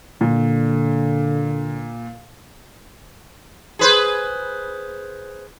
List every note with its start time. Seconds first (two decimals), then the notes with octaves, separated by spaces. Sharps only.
0.21 A#2 D3
3.79 G#4 B4 C5